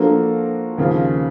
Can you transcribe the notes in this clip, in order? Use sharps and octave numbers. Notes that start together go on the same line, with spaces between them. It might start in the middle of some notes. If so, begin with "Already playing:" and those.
Already playing: F3 A#3 D4 F#4 A4
D#2 C#3 F3